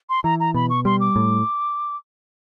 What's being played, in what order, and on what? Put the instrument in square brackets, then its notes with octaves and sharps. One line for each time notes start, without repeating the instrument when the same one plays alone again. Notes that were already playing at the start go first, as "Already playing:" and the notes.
[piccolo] C6
[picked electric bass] E3 [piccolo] A#5
[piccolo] A#5
[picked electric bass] B2 [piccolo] B5
[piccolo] C#6
[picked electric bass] G3 [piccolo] C6
[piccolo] D6
[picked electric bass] A2